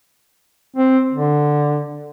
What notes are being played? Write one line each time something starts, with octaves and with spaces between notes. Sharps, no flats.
C4
D3